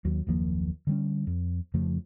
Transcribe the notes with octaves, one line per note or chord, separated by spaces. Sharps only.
D#2 F#3
F#1 D#2 F3 A#3
D3 G3 C#4
F2
F2 C#3 F3 A3